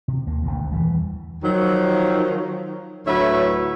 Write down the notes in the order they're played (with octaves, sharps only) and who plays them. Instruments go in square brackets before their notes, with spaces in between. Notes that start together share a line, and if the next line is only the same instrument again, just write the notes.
[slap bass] C3
D#2 A#3
G#1 D2 B2 D#3
E2 E3 G3
[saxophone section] D#3 F3 F#3
D2 A2 F#3 B4 C#5 E5